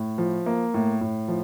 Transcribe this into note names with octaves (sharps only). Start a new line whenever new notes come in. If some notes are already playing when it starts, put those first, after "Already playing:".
Already playing: A2
F3
A#3
A2
A2
F3